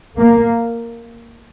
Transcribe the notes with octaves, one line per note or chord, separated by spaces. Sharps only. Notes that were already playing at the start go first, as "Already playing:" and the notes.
A#3